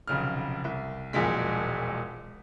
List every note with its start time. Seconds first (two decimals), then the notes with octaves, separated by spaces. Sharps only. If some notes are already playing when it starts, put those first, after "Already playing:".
0.07 F1 B1 C#3 F6
0.64 C2 E5
1.13 E1 B1 F2 A#2 G#3 B6